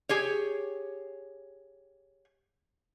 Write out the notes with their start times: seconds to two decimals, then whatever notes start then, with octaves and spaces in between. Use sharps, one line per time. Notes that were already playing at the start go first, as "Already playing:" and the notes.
0.09 G4 G#4 C#5